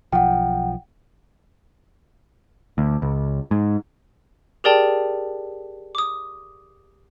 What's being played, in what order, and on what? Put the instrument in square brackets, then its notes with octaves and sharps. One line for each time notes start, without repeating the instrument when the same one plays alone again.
[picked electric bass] B1 F3 [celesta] F#5 G5
[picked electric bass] D2
C#2
G#2
[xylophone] G4 G#4 A#4 D5 G5 A5
D6 D#6